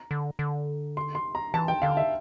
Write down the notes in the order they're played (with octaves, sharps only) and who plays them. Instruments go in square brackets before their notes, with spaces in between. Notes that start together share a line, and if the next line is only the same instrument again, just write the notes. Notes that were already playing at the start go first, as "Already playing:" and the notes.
Already playing: [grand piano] A#5
[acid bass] D3
D3
[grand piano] C6
C6
A#5
[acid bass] E3 [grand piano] A5
[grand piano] G5
[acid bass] D3 [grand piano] F5
[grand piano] E5